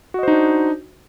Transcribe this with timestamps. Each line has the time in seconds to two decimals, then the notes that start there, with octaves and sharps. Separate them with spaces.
0.14 F#4
0.19 D#5
0.23 C5
0.28 D#4
0.32 D4